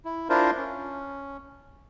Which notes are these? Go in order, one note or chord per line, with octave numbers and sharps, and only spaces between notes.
E4
D4 E4 F4 A#4 C5
C#4